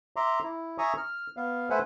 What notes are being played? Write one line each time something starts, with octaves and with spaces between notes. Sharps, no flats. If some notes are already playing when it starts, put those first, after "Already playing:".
E5 A#5 C6 D6
E4
E5 G#5 A#5 C#6 D#6
F6
B3 F5
A3 B4 C5 E5 F#5 G#5